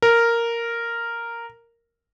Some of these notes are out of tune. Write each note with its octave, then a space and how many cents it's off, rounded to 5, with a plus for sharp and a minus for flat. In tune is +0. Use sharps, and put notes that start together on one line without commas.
A#4 -5